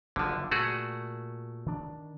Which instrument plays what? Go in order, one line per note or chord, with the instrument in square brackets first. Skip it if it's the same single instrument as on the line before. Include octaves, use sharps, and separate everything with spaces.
[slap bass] F#1 [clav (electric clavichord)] D3 F3
[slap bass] A#2 [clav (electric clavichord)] A3 F#4 G#4
[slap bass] D#3 D4